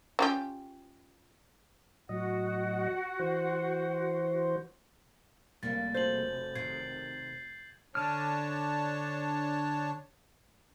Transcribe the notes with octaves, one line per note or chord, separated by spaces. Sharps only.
C#4 F4 G4
A2 F#3 F#4 D#5 F#5
E3 C5
F1 G3 A#3 A6
F#4 A4 C5 G6 F#7
C3 D#3 G#6 C7
D3 D4 C#5 A5 F6